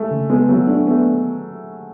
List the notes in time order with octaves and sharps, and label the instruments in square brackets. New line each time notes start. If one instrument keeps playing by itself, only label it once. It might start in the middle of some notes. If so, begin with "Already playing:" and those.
Already playing: [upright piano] G#3 A3
[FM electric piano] C#3
[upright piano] G#3 [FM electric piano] B3
[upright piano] F#3 [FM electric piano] B3
[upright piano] A3 [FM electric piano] D4
[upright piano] A3 [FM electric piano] B3